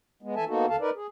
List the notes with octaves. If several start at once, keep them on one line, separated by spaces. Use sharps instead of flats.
G#3 B3
E3 A4 E5 G#5 A5
A#3 B3 D#4 F#4 A4
F2 D#3 A4 F5 A5
D#4 A#4 B4 D5
G#4